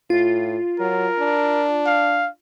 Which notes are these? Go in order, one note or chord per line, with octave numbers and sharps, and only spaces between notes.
A2 F4
F#3 A#4
D4
F5